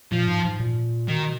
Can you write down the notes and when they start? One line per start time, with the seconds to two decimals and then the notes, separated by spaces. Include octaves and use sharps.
0.12 A#2 F3
0.28 G#2
0.45 G#2
0.60 A#2
1.08 B2 D#3